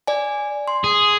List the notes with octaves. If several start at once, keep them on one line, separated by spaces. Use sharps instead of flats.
D5 G#5
C6
G#4